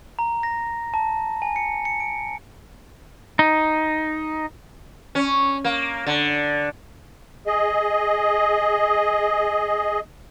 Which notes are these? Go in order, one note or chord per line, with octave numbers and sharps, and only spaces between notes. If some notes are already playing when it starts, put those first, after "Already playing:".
A#5
A#6
A5
G#5
C#7
C#7
D7
D#4
C#4
A#3
D3
G#4 D#5